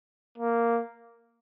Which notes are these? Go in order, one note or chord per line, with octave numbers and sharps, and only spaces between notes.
A#3